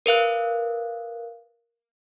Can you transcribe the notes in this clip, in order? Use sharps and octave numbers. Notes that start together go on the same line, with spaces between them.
A#4 B4 F5 F#6